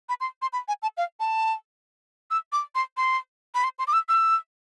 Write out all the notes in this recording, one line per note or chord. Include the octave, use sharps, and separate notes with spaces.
B5
C6
C6
B5
G#5
A5
F5
A5
E6
D6
C6
C6
B5
C6
C6
D6
E6
E6